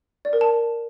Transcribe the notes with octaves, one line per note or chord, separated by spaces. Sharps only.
D5
A#4
A5